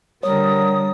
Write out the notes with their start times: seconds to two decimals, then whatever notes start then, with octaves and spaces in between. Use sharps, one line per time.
0.23 D3 G3 A#4 C#5 D#6